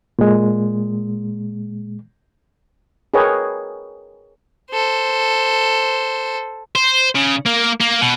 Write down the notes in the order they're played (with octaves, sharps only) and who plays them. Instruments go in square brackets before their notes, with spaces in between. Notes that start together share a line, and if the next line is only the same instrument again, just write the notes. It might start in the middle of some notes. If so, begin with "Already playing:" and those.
[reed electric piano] A#2 G#3
[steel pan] G#4 A#4 B4 C#5 D#5 G5
[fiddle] A4 C5
[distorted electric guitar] C5
C#3
A#3
A#3
B2